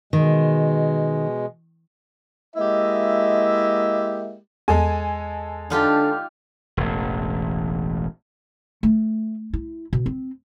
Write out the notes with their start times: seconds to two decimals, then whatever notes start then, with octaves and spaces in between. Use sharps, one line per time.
0.13 B2 D#3 G#3
2.56 G#3 A#3 E4 G4 D#5 E5
4.68 E2 G#3 A4 G#5
5.70 D3 D4 D#4 F4 G4
6.77 E1 A1
8.83 A3
9.54 E4
9.93 B2
10.06 C4